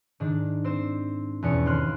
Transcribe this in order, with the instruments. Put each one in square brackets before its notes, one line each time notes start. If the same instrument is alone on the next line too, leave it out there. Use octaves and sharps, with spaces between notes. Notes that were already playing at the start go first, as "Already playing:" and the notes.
[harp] G#2 D#3 D4
C4 C5 E7
E2 B2 C#4 C#7
D#2 C6 F6 F#6